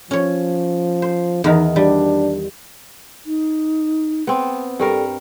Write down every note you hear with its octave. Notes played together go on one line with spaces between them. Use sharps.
F3 C#4 C#5
C5
E2 D#3 D#4
G3 D4
D#4
B3 C4
G2 G3 A4 A#4